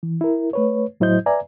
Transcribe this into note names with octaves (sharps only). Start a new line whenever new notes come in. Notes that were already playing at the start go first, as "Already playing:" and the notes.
E3
E4 A#4
A3 B4 C#5
A2 F#3 E4 C5 D#5 G6
B4 D5 E5 G#5 A#5